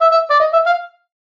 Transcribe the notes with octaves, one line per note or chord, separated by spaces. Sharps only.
E5
E5
D5
D#5
E5
F5